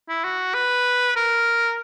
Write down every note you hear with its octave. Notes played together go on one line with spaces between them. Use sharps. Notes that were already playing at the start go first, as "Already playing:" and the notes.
E4
F#4
B4
A#4